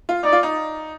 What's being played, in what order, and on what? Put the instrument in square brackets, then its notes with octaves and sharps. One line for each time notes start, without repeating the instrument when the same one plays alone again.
[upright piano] F4
[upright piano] D#4 [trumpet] D5
[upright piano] F4
D#4